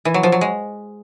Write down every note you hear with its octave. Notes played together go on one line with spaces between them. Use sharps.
E3
F#3
F3
F#3
G#3